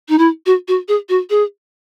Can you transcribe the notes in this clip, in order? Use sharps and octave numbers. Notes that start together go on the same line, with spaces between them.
D#4
E4
F#4
F#4
G#4
F#4
G#4